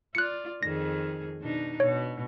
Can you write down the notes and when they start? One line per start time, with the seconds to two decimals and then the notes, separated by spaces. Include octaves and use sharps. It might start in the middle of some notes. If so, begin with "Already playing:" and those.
0.15 F4 D5 F#6 C#7
0.63 F2 D#3 G#4 A#6
1.40 B2 D4 D#4
1.80 B2 C#5